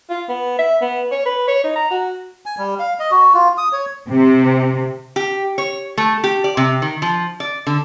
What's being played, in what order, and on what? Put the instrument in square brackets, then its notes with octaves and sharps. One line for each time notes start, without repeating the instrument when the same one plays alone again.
[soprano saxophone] F4
B3
E5
B3
C#5
B4
C#5
D#4
A#5
F#4
[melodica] G#5
G3
F5
D#5
F#4
F4
D#6
C#5
[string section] C3
[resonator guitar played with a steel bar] G4
C#5
A3
G4
D5
C3
D#3
F3
D5
D3